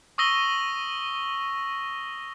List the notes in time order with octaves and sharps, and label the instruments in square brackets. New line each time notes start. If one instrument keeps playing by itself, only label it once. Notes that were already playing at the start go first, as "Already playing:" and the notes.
[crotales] C#6 D#6 E6 A#6 D#7 G7